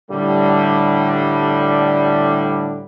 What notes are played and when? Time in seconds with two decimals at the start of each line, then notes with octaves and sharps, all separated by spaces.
0.11 A2 D3 G3